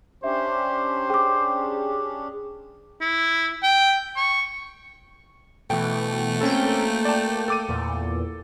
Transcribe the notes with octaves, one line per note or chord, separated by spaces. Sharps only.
C#4 D4 G4 C5 E5
G#4 G5 D6
E4
G5
C#6
B2 E3 A3 G5
A#3 C4 C#4 A4 G5
D5 A5
A4 D6 D#7
E2 A#2